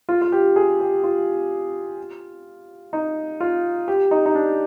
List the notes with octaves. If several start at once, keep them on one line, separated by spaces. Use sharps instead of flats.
F4
F4
G4
G#4
G4
F4
D#4
F4
G4
D#4
D#4
D4